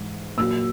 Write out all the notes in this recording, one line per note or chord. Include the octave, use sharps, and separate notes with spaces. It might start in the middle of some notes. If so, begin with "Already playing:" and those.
Already playing: G#2 E3
A#2 F#3 E6